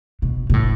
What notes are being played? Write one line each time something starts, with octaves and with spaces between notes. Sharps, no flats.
B2
B2
A2